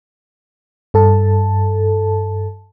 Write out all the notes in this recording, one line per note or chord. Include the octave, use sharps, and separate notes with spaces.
G2 A4 A5